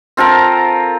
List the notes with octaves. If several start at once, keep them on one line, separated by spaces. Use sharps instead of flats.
C4 F4 A4 A#4